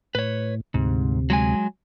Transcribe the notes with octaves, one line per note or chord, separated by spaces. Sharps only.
A2 B4 C#5
D2 G#2 C3
F#3 G#3 G#5